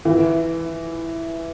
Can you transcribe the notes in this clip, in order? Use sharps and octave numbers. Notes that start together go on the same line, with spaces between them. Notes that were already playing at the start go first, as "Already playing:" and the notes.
E3